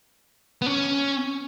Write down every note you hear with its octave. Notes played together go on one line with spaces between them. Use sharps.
B3
C#4